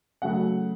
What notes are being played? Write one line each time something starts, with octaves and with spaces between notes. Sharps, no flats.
C#3 F#3 A3 F#5